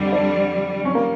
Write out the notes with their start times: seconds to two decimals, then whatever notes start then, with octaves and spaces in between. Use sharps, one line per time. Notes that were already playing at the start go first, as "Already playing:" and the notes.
Already playing: F2 D3 G3
0.12 D4
0.85 G3 C#4
0.95 A#3